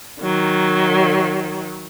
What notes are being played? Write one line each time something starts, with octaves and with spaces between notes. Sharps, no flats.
D#3 F#3